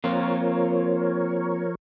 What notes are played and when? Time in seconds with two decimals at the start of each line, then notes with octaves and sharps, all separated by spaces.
0.04 F3 A#3 C4 F4 A#4 C#5